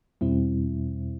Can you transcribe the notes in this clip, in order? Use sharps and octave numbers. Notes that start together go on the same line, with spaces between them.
E2 B2 G3 C4 E4